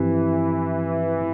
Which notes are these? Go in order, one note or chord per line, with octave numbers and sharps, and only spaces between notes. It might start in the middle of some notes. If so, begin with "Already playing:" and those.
Already playing: G2 E3 F3 C4 E4 G4